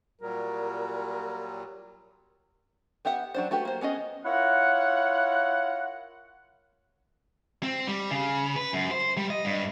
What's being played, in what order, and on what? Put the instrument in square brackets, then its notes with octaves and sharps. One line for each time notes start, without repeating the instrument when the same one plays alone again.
[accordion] A#2 F#3 G3 [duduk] A#4
[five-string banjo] B3 G4 E5 F#5
F#3 D4 C5
A3 F#4 G4 B4
A#3 C5
B3 C#4 G#4 D#5
[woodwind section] E4 F4 A#4 C#5 F#5
[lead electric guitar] C4
G3
C#3
B4
F#2
C5
G3
D#5
G2